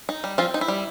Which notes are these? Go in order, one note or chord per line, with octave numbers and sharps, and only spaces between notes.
D#4
G3
F3 C4 F4
D#4
E4
G3